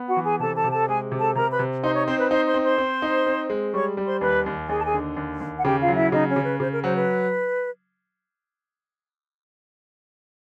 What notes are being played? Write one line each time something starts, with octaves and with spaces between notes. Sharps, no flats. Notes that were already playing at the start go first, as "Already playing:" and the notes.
Already playing: B3
F#4 F#5
E3
G#4 G#5
C3 A4 A5
A4 A5
C3
A4 A5
G#3 G#4 G#5
C3
A4 A5
C3 A#4 A#5
B4 B5
C3
D#4 C5 C6
C#5 C#6
C4 C5 C6
B4 B5
D#4 C5 C6
C5 C6
C4
C5 C6
C4
D#4
C4
G#3
G3 C#5 C#6
G3
C5 C6
D#2 B4 B5
D#2
D#2 G#4 G#5
A5
G#4 G#5
D3
D#2
D#2
F#5
C#3 G4 G5
F4 F5
F#3
E4 E5
C#3 D#4 D#5
C#4 C#5
C#3
B4
C#3 C5
A#4
F#3 C5
B4